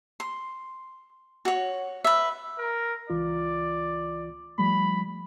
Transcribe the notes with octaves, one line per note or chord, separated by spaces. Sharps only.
C6
F#4 C#5
B4 E5
A#4
C#2 E3 F4 D5
F3 G3 A3 B5